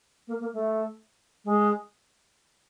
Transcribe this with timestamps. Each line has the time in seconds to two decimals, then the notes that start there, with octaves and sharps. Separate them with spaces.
0.28 A#3
0.40 A#3
0.53 A3
1.45 G#3